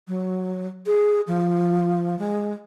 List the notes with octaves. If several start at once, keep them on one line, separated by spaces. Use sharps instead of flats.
F#3
G#4
F3
G#3